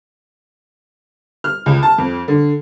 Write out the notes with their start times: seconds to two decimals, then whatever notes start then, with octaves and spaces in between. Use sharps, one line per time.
1.44 F6
1.66 C#2
1.83 A5
1.98 F2
2.28 D3